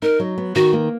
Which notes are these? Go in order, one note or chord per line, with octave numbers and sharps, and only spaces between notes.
D#4 A#4
F#3
B3
D#3 F#4
A#3